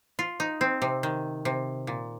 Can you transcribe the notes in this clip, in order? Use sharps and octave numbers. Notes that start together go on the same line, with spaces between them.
F4
D#4
C4
C3
D#3
C3
A#2